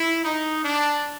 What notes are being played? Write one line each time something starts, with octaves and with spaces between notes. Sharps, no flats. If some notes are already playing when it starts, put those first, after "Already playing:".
Already playing: E4
D#4
D4